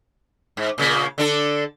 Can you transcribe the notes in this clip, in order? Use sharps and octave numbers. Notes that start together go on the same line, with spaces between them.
G#2
A#2 C#3 A#3
D3 D4 A4